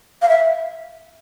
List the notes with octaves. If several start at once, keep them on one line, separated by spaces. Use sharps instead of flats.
F5
E5